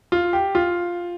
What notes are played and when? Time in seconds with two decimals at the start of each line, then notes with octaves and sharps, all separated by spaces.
0.12 F4
0.33 G4
0.55 F4